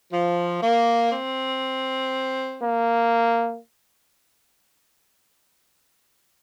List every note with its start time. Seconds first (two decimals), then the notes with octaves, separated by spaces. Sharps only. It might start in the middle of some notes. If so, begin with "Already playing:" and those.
0.12 F3
0.62 A#3
1.11 C4
2.62 A#3